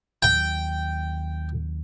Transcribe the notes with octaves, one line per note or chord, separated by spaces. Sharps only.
D#2 F#3 G5